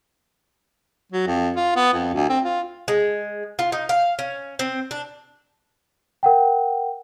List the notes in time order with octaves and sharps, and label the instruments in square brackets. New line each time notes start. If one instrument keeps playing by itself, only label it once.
[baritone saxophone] F#3
F2
F4
B3
F2
D2
C4
F4
[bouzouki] G#3
F4
D#4
F5
C#4
C4
D4
[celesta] A#4 F#5 G5